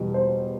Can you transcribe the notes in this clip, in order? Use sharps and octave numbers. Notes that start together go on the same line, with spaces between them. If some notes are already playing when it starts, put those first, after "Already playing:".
Already playing: E2 B2 G3
C5